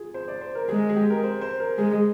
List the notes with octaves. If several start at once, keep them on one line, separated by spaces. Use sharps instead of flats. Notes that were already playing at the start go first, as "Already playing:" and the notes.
Already playing: F4 G#4
C5
D5
C5
A#4
G#3 G#4
G#4
G4
A#4
C5
C5
A#4
G#3 G#4